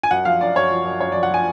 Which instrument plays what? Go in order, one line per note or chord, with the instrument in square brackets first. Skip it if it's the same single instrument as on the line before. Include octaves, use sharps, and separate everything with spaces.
[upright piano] G#5
F#2 F#5
F3 F5
F#2 D5
F#2 C#5
F3
F#2
F#2 C#5
F3 D5
F#5
F3 G#5